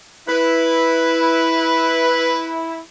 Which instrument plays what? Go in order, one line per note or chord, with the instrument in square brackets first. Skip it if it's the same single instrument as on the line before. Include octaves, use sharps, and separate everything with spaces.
[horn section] E4 [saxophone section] B4